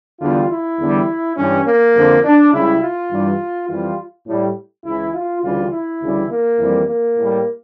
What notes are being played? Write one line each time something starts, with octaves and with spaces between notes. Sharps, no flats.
E2 D3 G3 F4
E4
E2 D3 G3
G2 E3 G3 C#4
A#3
F2 D3 F3
D4
C#2 C#3 G3 E4
F4
G2 E3 G3
F2 E3 G3 F4
A2 G3
C#2 C#3 E3 E4
F4
D2 C#3 E3 G3 F4
E4
D2 C#3 E3 G3
A#3
F2 E3 G3
A#3
A2 G3